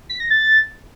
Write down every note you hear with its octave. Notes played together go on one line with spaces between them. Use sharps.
B6
A#6
A6